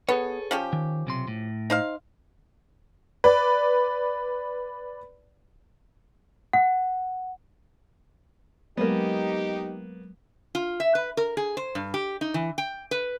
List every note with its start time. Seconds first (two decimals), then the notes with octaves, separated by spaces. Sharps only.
0.09 B3 G#4 A4 C#5
0.51 F3 C#4 G4
0.73 D#3
1.07 B1 C3 C6
1.28 A2
1.70 D#4 C5 F5
3.24 B4 D5
6.53 F#5
8.77 F#3 G#3 A#3 B3 D#4 G4
10.55 F4
10.80 E5
10.95 B4
11.17 A#4
11.37 G#4
11.57 C5
11.75 G2
11.94 G4
12.21 D#4
12.34 E3
12.58 G5
12.91 B4